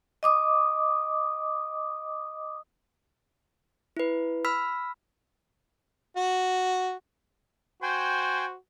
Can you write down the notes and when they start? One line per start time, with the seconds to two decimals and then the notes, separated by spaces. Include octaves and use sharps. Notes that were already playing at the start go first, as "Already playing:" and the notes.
0.23 D#5 D6 D#6
3.97 E4 B4
4.45 B5 E6 F6 B6
6.16 F#4
7.83 F#4 C5 G5 G#5